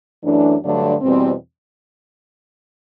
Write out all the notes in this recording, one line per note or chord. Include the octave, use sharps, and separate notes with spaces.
F#2 E3 A3 D4
G2 D3 F#3 A3 D4
E2 B2 G3 C4